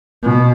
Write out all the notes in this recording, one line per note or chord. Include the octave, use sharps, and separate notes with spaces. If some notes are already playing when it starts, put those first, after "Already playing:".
B2